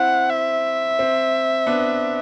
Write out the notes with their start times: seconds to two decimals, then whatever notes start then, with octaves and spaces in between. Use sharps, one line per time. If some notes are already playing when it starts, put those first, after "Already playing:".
Already playing: C4 E4 F#5
0.30 E5
0.99 C4
1.67 B3 D4